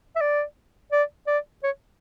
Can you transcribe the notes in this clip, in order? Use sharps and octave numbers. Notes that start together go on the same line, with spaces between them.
E5
D5
D5
D5
C#5